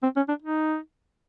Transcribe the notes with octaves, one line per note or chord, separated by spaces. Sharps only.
C4
C#4
D4
D#4